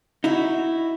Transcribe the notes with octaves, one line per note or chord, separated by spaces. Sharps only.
D#4 E4 F#4